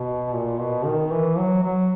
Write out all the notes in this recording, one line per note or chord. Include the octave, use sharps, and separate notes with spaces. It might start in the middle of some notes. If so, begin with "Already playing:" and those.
Already playing: B2
A#2
B2
D#3
E3
F#3
F#3